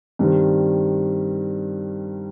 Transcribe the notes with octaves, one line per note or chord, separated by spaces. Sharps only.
G2 D#3 G3 C4